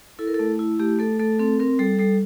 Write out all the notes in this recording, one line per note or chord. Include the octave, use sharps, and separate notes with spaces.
E4 A4
A#4
A4
A3
E4
A3 G4
A3 A4
A3 A4
C4 A4
C4 A#4
G3 A4
G3 A4